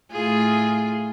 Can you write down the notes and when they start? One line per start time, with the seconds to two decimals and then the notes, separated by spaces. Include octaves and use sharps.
0.12 A2 F4 G#4